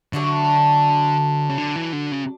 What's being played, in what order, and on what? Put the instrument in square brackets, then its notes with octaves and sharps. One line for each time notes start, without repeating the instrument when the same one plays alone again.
[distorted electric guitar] D3 [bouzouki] F#3 A3 D4 F#4
[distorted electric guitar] C#3
D3
E3
D3
C#3